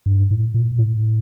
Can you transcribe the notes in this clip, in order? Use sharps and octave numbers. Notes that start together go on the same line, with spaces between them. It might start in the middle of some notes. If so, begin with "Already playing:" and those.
G2
A2
A#2
A2